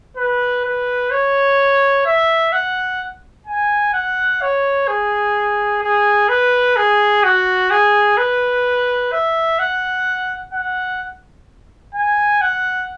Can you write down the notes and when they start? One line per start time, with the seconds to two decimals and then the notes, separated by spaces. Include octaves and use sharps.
0.17 B4
0.64 B4
1.11 C#5
2.06 E5
2.53 F#5
3.47 G#5
3.93 F#5
4.42 C#5
4.88 G#4
5.82 G#4
6.29 B4
6.77 G#4
7.23 F#4
7.71 G#4
8.18 B4
9.12 E5
9.59 F#5
10.53 F#5
11.95 G#5
12.41 F#5